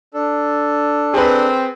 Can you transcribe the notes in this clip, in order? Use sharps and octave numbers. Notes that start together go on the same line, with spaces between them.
D4 A4
C4 G#4 B4